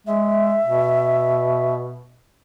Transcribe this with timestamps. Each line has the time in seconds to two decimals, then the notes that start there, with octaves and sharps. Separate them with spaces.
0.07 G#3 E5
0.64 B2